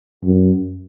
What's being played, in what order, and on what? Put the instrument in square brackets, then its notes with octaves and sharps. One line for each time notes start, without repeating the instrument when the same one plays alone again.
[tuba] F#2